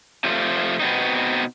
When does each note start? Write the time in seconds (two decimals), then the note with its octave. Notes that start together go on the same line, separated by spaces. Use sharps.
0.24 C3 F3 A3 F4
0.80 B2 B3 C4 D#4